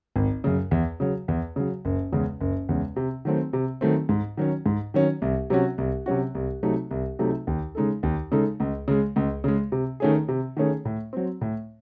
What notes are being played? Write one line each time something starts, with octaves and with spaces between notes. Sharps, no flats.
G#1
F#2 C#3
E2
C#3 F#3
E2
C#3 F#3
F#1
E2 C#3 G#3
F#1
E2 C#3 G#3
C3
D#3 F#3 A3 C4
C3
D#3 F#3 A3 C4
G#2
D#3 F#3 C#4
G#2
D#3 F#3 C#4
C2
C3 F#3 C#4 F#4
C2
C3 F#3 C#4 F#4
C2
C3 F#3 A3 D#4
C2
C3 F#3 A3 D#4
D#2
C#3 G#3 D#4 A4
D#2
C#3 G#3 D#4 A4
C#2
C#3 G#3
C#2
C#3 G#3
C3
D#3 A3 C#4 G#4
C3
D#3 A3 C#4 G#4
A2
F#3 C4
A2